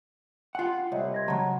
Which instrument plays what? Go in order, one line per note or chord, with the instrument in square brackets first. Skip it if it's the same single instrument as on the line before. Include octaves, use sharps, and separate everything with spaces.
[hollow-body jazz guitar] F4 F#5
[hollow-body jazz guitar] C2 [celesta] C#5 D#5 E5
[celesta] C6 G#6 A#6
[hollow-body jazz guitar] C#3 F#3 [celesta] F#5 A5 A#5